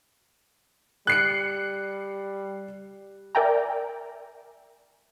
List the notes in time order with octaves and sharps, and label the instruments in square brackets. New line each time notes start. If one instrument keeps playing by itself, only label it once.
[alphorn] G3 [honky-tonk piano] F#6 C7 C#7
[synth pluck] A#4 D5 E5 G5 G#5 A#5